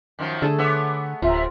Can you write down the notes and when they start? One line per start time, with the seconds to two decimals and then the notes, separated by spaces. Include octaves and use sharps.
0.19 F#2 D#3 F3
0.42 D3 A3 G#4 A4
0.59 B3 C#5 E5 C6 D6
1.22 D1 C3 F4 E5 A#5